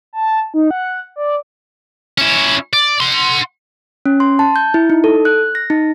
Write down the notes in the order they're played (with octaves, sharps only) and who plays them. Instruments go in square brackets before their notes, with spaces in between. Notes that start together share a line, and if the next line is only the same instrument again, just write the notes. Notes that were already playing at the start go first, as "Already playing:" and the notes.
[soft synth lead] A5
D#4
F#5
D5
[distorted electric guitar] C#4 E4
D5
F#5 C6
[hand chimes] C#4
C6
A5
G6
E4
D#4
A4
F#6
A#6
D#4